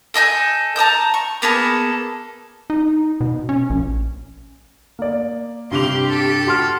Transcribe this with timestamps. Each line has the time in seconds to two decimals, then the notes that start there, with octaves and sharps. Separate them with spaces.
0.14 A4 D#5 G#5 G6
0.76 A5 A#5 D#6 G6
1.14 C#6
1.42 A#3 B3 G#4 A4
2.70 D#4
3.21 B2
3.49 C#4
3.70 A#1
4.99 A#3 D5
5.71 G2 C3 G4 C6 F7
6.09 A4
6.47 F#4 C6 F6